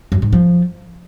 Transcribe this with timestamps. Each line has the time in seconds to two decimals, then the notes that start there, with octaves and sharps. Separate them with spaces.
0.12 F#2
0.22 G#2
0.33 F3